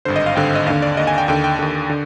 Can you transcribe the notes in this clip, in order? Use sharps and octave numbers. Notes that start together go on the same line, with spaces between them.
G#1 G2 D3 C5
D#5
F5
G#1 G2 D3 G5
D#5
D#2 D3 F5
D5
D#2 D3 D#5
G#5
G5
D#2 D3 G5
G5
D#2 D3
D3